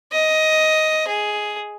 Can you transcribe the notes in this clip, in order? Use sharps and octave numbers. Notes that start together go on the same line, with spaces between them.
D#5
G#4